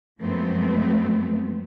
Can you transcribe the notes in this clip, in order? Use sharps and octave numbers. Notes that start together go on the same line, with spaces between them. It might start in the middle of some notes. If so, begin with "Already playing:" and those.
F#2 F3 G#3 A3 B3 C4